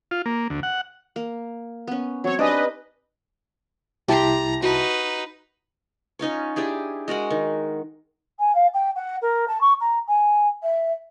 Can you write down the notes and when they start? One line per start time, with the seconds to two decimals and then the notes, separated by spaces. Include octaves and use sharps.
0.11 F4
0.26 A#3
0.50 D2
0.63 F#5
1.16 A#3
1.87 B3 C#4
2.24 F#3 C4 C#5
2.39 D4 D#4 G4 B4 D5 D#5 G#5
4.08 C2 E4 G4 A5 A#5 C6
4.62 D#4 F#4 B4
6.19 C#4 D#4 F4 C#5
6.56 D4 E4 G4 G#4
7.08 G#3 F#4 A#4 F#5
7.30 D#3
8.39 G#5
8.54 F5
8.74 G5
8.95 F#5
9.21 A#4
9.47 A5
9.60 C#6
9.80 A#5
10.07 G#5
10.62 E5